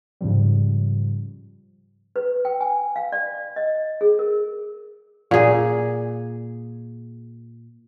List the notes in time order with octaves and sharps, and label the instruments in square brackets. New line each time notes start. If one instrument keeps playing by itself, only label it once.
[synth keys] G#2 C#3 F3 G3
[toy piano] B4
G5
G#5
F5
D5
D#5
G#4
A#4
[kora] A#2 G#4